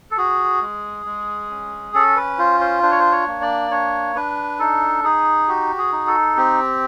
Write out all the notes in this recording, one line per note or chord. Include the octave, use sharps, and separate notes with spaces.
A4
F#4 G#4
G#3
G#3
C#4
C#4 A4
B4
F4 C5
C5
D4 C5
C#5
C5
C#5
A#3
D5
D4 C#5
D4 B4
D#4 A4
D#4 G#4
F#4 G4
G#4
D#4
A4
C4 G4